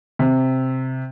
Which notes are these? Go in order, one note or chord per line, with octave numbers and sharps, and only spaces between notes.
C3